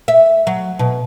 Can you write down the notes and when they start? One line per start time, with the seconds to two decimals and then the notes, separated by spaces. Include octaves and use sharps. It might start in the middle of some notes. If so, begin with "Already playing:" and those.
0.08 E5
0.47 F#3
0.79 B2